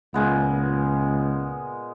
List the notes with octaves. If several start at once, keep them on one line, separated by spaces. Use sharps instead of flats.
C#2 A#2 G#3 B3